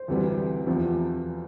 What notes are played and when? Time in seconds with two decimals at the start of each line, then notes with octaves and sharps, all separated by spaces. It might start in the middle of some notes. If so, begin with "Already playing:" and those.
Already playing: C5
0.08 D2 C3 E3 G3
0.66 E2 C3 F3